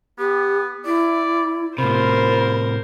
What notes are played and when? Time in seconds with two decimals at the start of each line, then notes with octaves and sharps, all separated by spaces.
0.18 B3 G4
0.86 E4 D5
1.78 A2 C3 F4 A#4 C5 B5